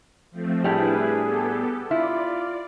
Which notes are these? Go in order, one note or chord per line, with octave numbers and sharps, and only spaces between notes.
F3 A3 C4
A2 G3 D4 E4 G#4 B4
B3 G4 A4
E4 F4 D5